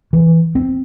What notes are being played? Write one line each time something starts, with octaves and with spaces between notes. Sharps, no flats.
E3
C4